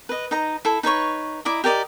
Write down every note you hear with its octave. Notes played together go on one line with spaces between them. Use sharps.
B4 D#5
D#4 D#5 A#5
E4 A4
D#4 B4 C#5 C#6
E4 D5 D#5 A#5
G4 A#4 D5 D#5